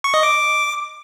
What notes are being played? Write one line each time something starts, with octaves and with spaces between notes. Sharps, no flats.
C#6
D#5
D6